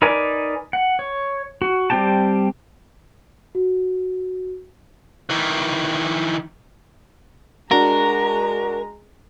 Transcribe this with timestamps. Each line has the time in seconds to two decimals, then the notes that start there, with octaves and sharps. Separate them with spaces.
0.02 D#4 A#4 B4 D5 G#5
0.73 F#5
0.99 C#5
1.62 F#4
1.90 G3 C4 G4 G5 A5
3.55 F#4
5.30 D#3 E3
7.71 G#3 D4 F#4 A#4 A#5